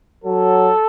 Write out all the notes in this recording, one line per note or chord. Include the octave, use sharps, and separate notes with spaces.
F#3 A4